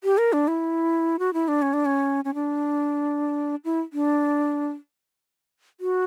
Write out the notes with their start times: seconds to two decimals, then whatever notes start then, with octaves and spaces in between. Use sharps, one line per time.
0.04 G4
0.18 A#4
0.33 D4
0.48 E4
1.19 F#4
1.33 E4
1.48 D4
1.62 C#4
1.73 D4
1.85 C#4
2.25 C#4
2.34 D4
3.65 E4
3.93 D4
5.80 F#4